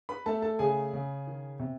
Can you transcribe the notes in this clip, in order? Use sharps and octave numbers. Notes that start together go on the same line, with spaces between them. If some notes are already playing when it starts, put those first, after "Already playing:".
B4 B5
A3 A4 A5
A4 A5
C#3 G#4 G#5
C#3
D#3
C3